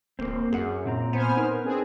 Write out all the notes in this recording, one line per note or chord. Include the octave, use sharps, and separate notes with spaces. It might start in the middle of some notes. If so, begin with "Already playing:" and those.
D1 A#3 C4
F#2 G#4 F#5
A#2 C4 A#5
B3 C5 G#5 F6
D#4 A#4 B4
C4 D4 G#4